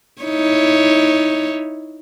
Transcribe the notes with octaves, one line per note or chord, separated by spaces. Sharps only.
D#4 E4 C#5